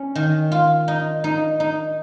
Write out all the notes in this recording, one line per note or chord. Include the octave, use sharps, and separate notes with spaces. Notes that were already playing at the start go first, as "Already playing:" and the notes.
Already playing: C#4
D#3
F4
D#4
D#4
D#4